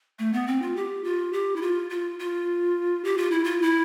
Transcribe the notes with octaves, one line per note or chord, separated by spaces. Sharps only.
A3
B3
C4
F4
G4
F4
G4
E4
F4
F4
F4
G4
F4
E4
F4
E4